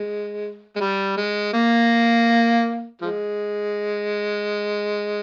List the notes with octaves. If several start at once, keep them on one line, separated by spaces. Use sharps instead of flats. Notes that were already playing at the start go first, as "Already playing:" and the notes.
Already playing: G#3
G#3
G3
G#3
A#3
F3 G#3